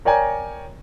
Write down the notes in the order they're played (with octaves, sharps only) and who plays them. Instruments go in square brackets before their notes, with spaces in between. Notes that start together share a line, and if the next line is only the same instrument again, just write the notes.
[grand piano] A#4 C#5 D5 G5 G#5 A#5